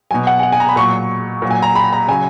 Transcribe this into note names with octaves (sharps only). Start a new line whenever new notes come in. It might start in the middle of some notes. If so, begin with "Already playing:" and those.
B2 F#3 G#5
F#5
G#5
F#5
G#5
A#5
B5
A#2 F#3 C#6
A#2 F#3
G#5
A#5
B5
A#5
C#3 F#3 G#5